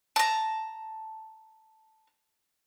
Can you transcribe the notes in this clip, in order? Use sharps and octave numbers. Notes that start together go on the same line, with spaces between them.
A5 A#5